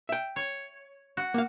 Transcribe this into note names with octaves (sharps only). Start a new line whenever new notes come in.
E5 G5
C#5
F#4
A#3 F5